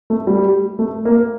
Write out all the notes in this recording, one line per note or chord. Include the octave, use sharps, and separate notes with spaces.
A3
G3
A3
A#3